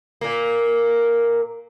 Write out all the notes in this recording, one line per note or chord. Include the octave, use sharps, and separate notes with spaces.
A#2 A#3